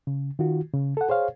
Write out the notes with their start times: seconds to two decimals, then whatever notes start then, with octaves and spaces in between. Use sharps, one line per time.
0.07 C#3
0.39 D#3 F4 F#4
0.73 C#3
0.97 A4 F#5
1.09 G#4 C5 C#5 F5